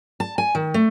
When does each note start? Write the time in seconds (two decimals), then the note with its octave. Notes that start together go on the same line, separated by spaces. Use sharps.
0.20 A5
0.38 G#5
0.55 D#3
0.74 A3